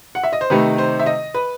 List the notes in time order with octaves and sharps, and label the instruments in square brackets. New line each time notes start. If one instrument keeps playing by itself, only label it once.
[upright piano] F#5
E5
D#5
C5
C3 D#3 A3 D#4 B4
C5
E5
D#5
B4